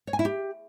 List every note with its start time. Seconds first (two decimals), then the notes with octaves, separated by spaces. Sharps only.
0.07 C#5
0.13 G#5
0.19 E4
0.25 G4